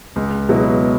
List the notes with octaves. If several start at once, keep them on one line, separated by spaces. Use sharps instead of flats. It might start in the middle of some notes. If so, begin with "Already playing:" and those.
C#2
B2 F#3 B3 E4